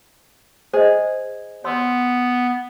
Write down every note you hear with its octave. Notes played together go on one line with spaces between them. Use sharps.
G#4 C5 D#5
B3 C#5 C6 E6